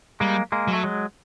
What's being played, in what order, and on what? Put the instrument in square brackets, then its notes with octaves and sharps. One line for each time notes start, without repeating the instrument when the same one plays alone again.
[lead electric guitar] G3 [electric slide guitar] G#3 A#3
[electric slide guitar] G#3 A#3
[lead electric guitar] F#3
[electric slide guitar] A3
F#3 G#3